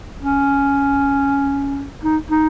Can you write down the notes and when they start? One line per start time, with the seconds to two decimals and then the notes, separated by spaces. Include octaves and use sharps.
0.22 C#4
2.04 D#4
2.31 D#4